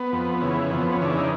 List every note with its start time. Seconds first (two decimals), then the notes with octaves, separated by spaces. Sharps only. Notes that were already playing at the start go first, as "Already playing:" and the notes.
Already playing: B3
0.12 F2
0.42 C#3 E3
0.71 F2 B3
0.93 C#4
1.01 C#3 E3 D4
1.18 D#4